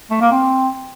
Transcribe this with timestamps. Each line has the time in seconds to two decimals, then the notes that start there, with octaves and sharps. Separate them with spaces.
0.10 A3
0.21 A#3
0.31 C4